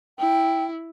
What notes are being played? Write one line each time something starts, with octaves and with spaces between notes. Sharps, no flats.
E4 G5